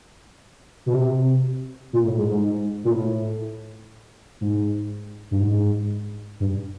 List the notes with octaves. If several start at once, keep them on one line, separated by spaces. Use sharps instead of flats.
B2
C3
A#2
A2
G#2
G#2
A#2
A2
G#2
G2
G#2
G2